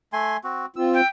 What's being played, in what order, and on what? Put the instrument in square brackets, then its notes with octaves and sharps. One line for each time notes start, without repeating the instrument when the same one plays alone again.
[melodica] A3 G#5 C6
C4 F#4
[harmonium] C4 F4 [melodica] E6
[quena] G5